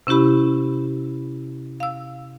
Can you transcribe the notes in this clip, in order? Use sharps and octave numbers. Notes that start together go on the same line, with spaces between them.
C3 C#4 E4 G4 B5
F5 E6